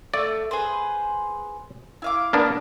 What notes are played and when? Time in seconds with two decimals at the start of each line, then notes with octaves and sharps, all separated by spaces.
0.14 A3 D5
0.51 G#4 B4 C5
2.02 E4 F5 D6
2.33 A#3 B3 D4